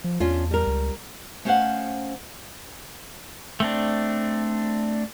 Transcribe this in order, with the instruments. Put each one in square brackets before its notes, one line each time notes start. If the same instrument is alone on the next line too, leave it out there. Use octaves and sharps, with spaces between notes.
[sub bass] F3
[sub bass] E2 [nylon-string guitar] C#4 D4 F4
[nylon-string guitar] G3 A#4
[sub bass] C#2
[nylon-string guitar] A3 C#4 C5 C#5 F5 F#5
[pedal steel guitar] A3 C4 D4